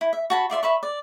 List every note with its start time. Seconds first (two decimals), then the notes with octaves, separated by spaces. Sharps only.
0.01 E4
0.13 E5
0.30 F#4 A5 B5
0.50 F4 D5 E5 C6
0.63 B4 E5 B5 C#6
0.83 D5